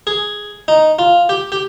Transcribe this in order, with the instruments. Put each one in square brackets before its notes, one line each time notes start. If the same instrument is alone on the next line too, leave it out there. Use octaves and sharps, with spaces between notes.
[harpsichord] G#4
D#4
F4
G4
G4